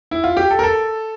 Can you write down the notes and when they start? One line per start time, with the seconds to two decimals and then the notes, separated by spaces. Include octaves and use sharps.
0.11 E4
0.24 F4
0.37 G4
0.51 A4
0.59 A#4
0.63 A4